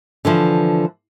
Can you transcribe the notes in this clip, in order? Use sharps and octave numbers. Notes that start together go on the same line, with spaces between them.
D3 E3 F3